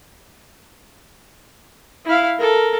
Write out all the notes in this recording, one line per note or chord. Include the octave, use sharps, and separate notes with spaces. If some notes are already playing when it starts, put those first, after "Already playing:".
E4 F5
A4 A#4